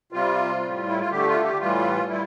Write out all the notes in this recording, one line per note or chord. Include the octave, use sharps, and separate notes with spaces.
C3 G3 F4
A2 G3
E4
F4
D3 A3 G4
F4
G4
A2 E3 G3 F4
G3 E4